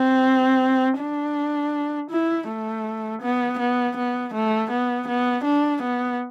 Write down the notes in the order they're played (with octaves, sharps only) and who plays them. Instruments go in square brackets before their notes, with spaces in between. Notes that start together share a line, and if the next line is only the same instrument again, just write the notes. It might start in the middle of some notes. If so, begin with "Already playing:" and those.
Already playing: [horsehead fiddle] C4
D4
E4
A3
B3
B3
B3
A3
B3
B3
D4
B3